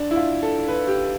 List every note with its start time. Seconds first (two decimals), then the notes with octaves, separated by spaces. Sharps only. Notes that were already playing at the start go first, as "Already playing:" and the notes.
Already playing: D4
0.11 E4
0.16 F4
0.43 A4
0.68 B4
0.87 G4